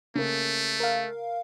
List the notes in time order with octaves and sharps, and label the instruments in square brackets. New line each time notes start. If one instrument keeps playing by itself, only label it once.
[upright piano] C#3 A#3 [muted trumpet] A3
[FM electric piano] A#4 F5